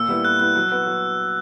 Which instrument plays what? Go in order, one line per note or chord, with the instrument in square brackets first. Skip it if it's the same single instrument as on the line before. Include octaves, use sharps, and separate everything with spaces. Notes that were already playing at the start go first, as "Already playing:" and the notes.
Already playing: [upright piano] A#2 [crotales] E6
[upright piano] G3 B3 E4
[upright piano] A#2 [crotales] F#6
[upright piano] G3 B3 E4 [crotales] F#6
[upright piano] F#3
B3 F#4 B4
F#3